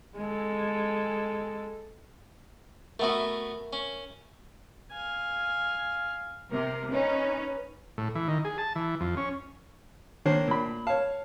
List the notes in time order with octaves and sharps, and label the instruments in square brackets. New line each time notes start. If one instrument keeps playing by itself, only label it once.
[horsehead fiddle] G#3 A4
[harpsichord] A3 B3 F#4 [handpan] A#4 E5
[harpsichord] C#4
[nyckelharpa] F5 G#5
[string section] C3 [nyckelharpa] A#4
[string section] C#4 D#4 [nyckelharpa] B4
[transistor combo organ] A2
E3
D#3
G#4
A5
E3
F2
C#4
[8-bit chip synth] D#3 D4 C7 [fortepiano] A#3 C5 C#5
[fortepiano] A#2 B5
[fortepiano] C#5 F5 [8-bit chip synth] A5